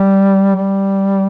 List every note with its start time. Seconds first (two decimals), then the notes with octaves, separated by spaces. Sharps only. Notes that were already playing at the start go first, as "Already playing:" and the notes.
Already playing: G3
0.56 G3